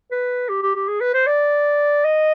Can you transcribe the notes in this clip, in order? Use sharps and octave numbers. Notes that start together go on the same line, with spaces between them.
B4
G4
G4
G4
G#4
B4
C5
D5
D#5